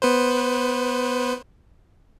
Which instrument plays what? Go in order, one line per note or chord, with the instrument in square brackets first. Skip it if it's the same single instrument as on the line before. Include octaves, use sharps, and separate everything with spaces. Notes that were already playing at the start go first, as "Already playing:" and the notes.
[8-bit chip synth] B3 B4 C5